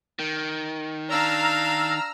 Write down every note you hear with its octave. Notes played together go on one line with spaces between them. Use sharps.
D#3
D4 F5 A#5 E6 F6